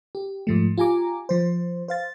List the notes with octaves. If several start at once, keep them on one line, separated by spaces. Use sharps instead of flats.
G4
G#2 F3 A3
F4 G4 G#5 A#5 D6
F3 C5
C5 F5 A6